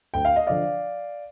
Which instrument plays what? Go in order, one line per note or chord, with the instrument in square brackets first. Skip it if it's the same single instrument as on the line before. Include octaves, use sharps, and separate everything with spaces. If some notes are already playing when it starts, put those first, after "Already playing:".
[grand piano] D2 G5
F5
D#5
D3 F3 D5 F5